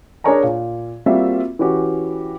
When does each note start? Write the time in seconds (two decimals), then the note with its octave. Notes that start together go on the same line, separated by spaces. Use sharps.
0.24 D4 G#4 A#4 C#5 G#5 A#5
0.43 A#2
1.06 G3 A#3 C4 F4 F#4 E5
1.59 E3 C#4 F#4 G4